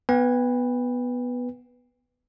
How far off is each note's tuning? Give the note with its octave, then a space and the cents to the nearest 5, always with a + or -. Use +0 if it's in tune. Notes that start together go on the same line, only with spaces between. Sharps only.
B3 +0 B4 +0 G5 +40